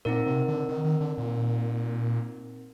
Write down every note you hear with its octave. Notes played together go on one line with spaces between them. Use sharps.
A#2 C4 D#4 A#4
C3
D3
D#3
D#3
D3
A#2